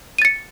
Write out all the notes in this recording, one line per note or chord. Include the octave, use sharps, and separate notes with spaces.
A6 C#7 D#7